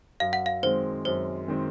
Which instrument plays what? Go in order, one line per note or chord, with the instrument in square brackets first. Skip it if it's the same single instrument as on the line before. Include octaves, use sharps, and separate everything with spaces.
[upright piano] F#2 [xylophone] F5
[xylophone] F#5
F5
[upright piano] D#3 G#3 C4 [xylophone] C5
[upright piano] F#2 [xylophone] C5
[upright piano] D#3 G#3 C4